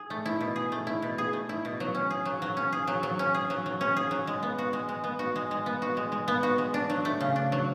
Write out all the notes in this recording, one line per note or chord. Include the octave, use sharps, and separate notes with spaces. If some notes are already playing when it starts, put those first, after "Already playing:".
Already playing: G#4
A3
E4
B2
G#4
A3
E4
B2
G#4
A3
E4
B2
F#3
C#4
G#4
F#3
F#3
C#4
G#4
F#3
F#3
C#4
G#4
F#3
F#3
C#4
G#4
F#3
G#3
B3
F#4
G#3
G#3
B3
F#4
G#3
G#3
B3
F#4
G#3
G#3
B3
F#4
G#3
D4
F#3
A3
C#3
D4
F#3